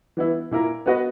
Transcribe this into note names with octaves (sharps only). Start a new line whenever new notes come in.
E3 B3 E4
A#2 A#3 E4 A#4
B3 F#4 B4 D#5